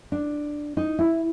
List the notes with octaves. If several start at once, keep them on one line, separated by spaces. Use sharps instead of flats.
D4
D#4
E4